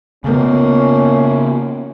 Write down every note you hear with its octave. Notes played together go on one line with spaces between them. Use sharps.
C#3 A#3 B3 C#4